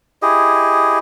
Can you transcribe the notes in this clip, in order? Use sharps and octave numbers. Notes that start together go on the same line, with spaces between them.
E4 G4 G#4 D#5